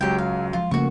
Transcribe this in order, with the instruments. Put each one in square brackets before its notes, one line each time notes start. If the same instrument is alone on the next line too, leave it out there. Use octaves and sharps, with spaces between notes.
[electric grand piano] C#2 F#3 [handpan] G#3 [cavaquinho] G4 G5
[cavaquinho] F5
[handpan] F3 [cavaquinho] F4
[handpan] C#3 A3 A#3 [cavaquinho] F#4 C#6